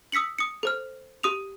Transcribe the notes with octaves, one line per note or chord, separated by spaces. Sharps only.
D#6 E6 B6 C#7 F#7
D#6 C#7
A4 C5 F6
G4 D#6 F7